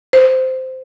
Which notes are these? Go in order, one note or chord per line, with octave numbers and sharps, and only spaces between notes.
C5